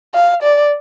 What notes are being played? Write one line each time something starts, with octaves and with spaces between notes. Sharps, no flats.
F5
D5